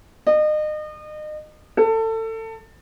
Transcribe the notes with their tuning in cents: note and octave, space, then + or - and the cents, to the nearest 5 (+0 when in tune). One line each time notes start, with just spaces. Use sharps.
D#5 -35
A4 +25